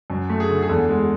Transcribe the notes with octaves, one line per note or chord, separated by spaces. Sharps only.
F#2
A3
G#4
D3
G#4
E2 A4
G#3